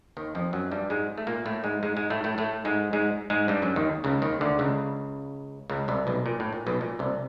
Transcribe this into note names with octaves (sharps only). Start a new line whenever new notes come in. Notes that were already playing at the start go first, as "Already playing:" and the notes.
D#2 D#3
F2 F3
F#2 F#3
G2 G3
G#2 G#3
A3
A#2 A#3
A2 A3
G#2 G#3
G#2 G#3
G#2 G#3
A2 A3
A2 A3
A2 A3
G#2 G#3
G#2 G#3
G#2 G#3
G2 G3
F#2 F#3
D#2 D#3
C#2 C#3
D#2 D#3
D2 D3
C#2 C#3
C#2 C#3
C2 C3
B1 B2
A#2
A2
A#2
B1 B2
A#2
C2 C3